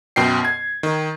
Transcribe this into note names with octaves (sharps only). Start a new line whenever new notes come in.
F#2 B2 G5 C7
G#6
D#3